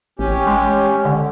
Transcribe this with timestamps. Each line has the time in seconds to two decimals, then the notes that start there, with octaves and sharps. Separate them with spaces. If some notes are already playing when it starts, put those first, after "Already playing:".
0.19 A1 C#4 G4
0.47 G#3
1.05 D3